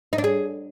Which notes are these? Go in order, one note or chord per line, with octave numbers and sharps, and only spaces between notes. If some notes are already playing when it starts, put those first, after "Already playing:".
D#4
D4
G#4